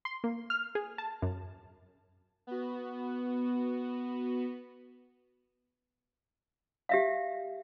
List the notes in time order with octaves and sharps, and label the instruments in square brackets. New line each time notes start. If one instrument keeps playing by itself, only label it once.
[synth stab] C6
A#3
F6
G#4
A5
F#2
[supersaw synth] B3 F#4
[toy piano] G4 E5 F5